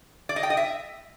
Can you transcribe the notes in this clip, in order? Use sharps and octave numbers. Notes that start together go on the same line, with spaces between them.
D5
D#5
G5
D#5
E5